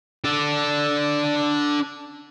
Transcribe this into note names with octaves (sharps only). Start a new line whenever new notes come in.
D4 A4